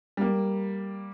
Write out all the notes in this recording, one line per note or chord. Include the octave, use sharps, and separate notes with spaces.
G3 A#3